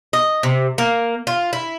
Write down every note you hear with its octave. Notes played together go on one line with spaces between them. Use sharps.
D#5
C3
A#3
F4
E4